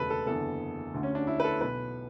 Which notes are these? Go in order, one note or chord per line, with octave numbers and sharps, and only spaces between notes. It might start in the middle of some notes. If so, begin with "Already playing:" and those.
Already playing: E1 D2 C#3 E3 A4 B4
A4
F#1 E2 D3 A4
D2 D3
C#4
D4
E4
B4
A4
B1 B2 B4